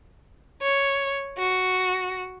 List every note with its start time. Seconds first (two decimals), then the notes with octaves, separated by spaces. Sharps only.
0.62 C#5
1.38 F#4